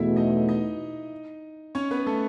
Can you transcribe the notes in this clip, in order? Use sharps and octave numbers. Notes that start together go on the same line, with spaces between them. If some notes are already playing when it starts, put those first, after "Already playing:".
Already playing: E2 B2 A3 E4 E5
D#4 D#5
D#4 D#5
C#4 C#5
B3 B4
A3 A4